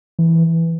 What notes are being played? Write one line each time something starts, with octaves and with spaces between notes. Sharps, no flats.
E3